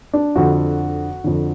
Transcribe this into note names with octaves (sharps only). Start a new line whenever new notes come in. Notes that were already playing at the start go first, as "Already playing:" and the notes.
D4
F2 D3 F#4
F2 D3